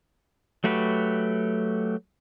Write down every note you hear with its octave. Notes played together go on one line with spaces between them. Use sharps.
F#3 A3 F#4 G4 B4